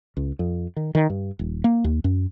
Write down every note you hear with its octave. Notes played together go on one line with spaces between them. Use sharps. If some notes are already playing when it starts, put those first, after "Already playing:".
C#2
F2
D#3
D#3
G2
D#1
A#3
D#2
F#2